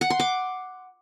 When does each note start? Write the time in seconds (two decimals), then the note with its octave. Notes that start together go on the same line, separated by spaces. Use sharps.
0.01 F#5
0.10 C6
0.20 D6